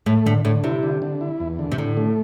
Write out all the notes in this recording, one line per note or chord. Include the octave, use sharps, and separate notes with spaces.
A2 A3
A2 D3
A2 D3
C3 E4
D3
D3
E4
E2
D3
C3
A2 D3
A3